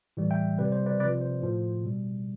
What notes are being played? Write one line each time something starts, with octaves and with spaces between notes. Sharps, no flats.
A2 E3 G3
E5 G5
C3 G3 B4
C5
B4 D5
C3 F3 B4 D5
C5
A2 F3
B2 G3